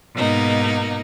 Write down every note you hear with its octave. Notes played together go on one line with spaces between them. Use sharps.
G#2 B2 A#3 D#4